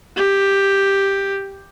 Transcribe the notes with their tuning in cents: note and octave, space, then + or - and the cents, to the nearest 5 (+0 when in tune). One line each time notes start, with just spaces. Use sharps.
G4 +5